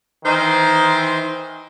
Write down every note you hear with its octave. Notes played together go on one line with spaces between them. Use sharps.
D#3 E3 D#4 C5